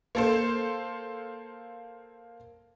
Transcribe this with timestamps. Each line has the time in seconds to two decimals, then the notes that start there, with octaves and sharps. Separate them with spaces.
0.15 A#3 A4 C5